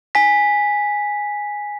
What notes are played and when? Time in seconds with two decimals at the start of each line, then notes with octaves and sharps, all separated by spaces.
0.15 G#5 B6